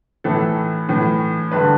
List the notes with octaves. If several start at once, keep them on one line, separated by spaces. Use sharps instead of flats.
A2 E3 A4
A2 E3
G2 D3 B4